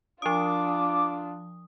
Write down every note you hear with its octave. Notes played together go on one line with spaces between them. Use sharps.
F3 D4 F4 D6 D#6